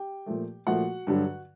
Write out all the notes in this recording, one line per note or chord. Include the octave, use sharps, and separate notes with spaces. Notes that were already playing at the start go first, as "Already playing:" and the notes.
Already playing: G4 G5
A#2 F3 A3
A#2 F3 A3 F#4 F#5
G2 D3 F#3